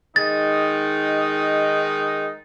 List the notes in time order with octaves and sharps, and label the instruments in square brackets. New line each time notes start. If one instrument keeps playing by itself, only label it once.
[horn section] D#3 G#3 D#4 [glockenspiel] A6